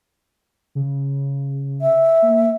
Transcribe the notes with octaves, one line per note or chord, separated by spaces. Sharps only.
C#3
E5
A#3